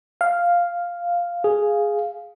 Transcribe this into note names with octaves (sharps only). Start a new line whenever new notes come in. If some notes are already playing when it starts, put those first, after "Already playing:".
F5
G#4